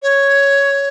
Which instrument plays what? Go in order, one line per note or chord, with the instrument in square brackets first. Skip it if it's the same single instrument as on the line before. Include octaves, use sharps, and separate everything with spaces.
[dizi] C#5